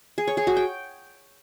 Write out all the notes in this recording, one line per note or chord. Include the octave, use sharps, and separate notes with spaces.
G#4
C#5
G#4
F#4
G5